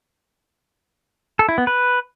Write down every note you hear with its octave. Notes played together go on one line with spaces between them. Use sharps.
A4
E4
B3
B4